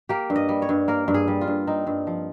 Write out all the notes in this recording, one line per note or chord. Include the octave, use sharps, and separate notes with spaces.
A#3 G4
G2
D#5
G3
C#5
G2
A#3 A#4
G2
G#4
G3
F4
G2
C4 D#4
G2
F3